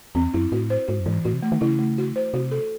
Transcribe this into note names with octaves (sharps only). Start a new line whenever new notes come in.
E2 C4
F#2 E4
A2 F#4
C5
G#2 F#4
F#2
G#2 E3
A2 F#4
C3
A3
D#3
C#3 E4
A3
F#4
C5
C3 F#4
A4